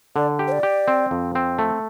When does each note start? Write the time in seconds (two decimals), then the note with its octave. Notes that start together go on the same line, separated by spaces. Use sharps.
0.16 D3 D5
0.39 G4
0.48 C5
0.52 D5
0.63 G4
0.88 C4
1.11 F2
1.35 C4
1.59 A3